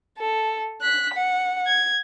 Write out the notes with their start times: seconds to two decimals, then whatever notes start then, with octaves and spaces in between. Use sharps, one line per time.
0.18 A4
0.82 F#6 B6
1.14 F#5
1.66 G#6